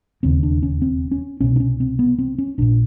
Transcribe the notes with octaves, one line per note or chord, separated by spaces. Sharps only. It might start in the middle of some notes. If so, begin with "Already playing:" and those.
E1 D#2 C#3 C4
D4
C#4
C4
C#4
C2 B2 C#4
D4
C#4
C4
B3
C4
C#4
A#1 A#2 D4